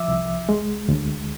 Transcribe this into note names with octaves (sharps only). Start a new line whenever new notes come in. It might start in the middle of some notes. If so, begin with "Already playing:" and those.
Already playing: F3 E5 D6 E6
C2
G#3
D2